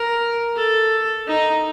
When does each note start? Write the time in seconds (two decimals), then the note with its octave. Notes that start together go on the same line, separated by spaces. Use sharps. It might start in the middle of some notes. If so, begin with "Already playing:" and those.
Already playing: A#4
0.56 A4
1.27 D#4